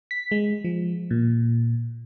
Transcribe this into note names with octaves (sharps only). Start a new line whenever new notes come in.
B6
G#3
F3
A#2